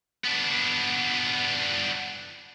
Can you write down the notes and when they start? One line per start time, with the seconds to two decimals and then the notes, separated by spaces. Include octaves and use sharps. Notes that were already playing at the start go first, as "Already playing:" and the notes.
0.24 B3 D4